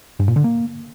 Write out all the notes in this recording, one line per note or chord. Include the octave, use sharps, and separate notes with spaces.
G2
A#2
D3
A#3